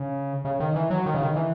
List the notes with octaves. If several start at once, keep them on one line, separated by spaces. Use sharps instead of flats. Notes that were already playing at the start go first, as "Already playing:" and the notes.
Already playing: C#3
C#3
D#3
E3
F#3
D#3
C#3
D#3
E3